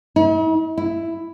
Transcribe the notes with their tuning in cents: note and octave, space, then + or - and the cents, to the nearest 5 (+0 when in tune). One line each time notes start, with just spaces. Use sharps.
E4 -45
E4 +5